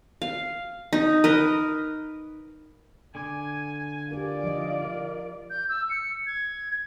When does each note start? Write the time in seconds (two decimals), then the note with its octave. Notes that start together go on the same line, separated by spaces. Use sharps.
0.22 F5
0.93 D#4
1.24 A#4 B4 D#5
3.15 D3 G#5 D6
4.11 F4 G4 A#4 D5
4.44 F3 D#5
4.85 A#4
5.50 G6
5.69 E6
5.90 C#7
6.26 G#6